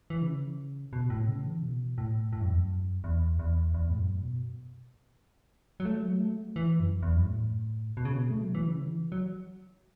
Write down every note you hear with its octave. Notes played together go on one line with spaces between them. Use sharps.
E3
C#3
B2
A2
C#3
E3
B2
A2
A2
F#2
E2
F#2
E2
E2
E2
A2
F#2
B2
F#3
A3
F#3
A3
E3
F#2
E2
F#2
A2
B2
C#3
B2
A3
F#3
E3
C#3
E3
F#3